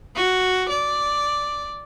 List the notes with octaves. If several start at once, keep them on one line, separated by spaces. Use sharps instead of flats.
F#4
D5